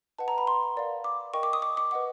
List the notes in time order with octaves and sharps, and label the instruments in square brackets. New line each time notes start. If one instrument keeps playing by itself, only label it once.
[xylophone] B4 D#5 F#5 A5
A#5
B5
C6
A#4 D5 F5
D6
A#4 D#5 G5 C#6
D6
D#6
D6
D6
B4 D#5 F#5 D6